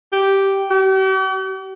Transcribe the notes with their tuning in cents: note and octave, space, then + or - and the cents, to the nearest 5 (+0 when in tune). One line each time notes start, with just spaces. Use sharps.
G4 -5
G4 -45